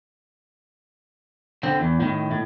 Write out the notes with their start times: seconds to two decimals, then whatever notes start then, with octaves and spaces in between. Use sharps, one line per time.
1.63 D3 C4
1.80 E2
2.00 A2 D#3
2.31 A2